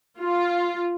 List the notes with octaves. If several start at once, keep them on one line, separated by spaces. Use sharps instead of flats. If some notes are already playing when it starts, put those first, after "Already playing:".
F4